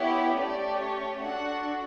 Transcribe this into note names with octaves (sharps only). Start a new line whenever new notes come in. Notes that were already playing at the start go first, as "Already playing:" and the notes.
Already playing: B3 E4 G4 C#5
A3 C#4 G4 D5
C#5
D4 F#4 A4 F#5